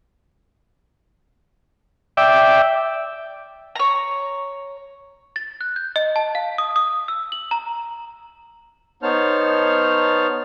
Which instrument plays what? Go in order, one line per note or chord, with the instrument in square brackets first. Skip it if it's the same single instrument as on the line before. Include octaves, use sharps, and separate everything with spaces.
[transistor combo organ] D5 E5 G5
[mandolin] C#5 A#5
[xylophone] A6
F#6
G6
D#5
A5
F5
D#6
D#6
E6
F#7
A#5
[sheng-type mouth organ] B3 D#4 C5 C#5 A5 F6